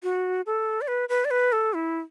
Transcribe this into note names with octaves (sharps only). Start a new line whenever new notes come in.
F#4
A4
D5
B4
B4
D5
B4
A4
E4